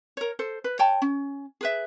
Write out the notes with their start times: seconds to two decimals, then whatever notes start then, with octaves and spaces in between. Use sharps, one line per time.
0.17 A#4 C#5
0.39 A4 C5
0.64 B4
0.79 C#5 G5 A5
1.02 C#4
1.61 G#4 B4 E5